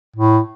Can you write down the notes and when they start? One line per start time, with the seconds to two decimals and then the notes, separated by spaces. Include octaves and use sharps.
0.16 A2